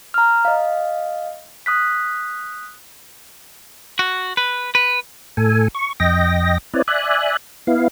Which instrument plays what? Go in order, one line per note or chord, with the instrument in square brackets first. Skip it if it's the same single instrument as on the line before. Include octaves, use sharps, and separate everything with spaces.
[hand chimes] A#5 F6
D#5 F5
D#6 F#6 B6
[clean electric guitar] F#4
B4
B4
[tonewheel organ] A2 A4 G#5
C#6
F2 D#5 G5 A#6
C4 E4 B4 C#5 D5
D5 E5 G#5 F#6
B3 E4 F5